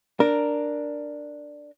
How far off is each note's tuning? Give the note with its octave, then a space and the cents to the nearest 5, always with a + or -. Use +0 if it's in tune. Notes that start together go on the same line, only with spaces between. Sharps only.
D4 +5 A#4 +0